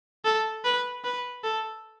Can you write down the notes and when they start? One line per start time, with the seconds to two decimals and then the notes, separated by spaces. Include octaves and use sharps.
0.25 A4
0.64 B4
1.04 B4
1.44 A4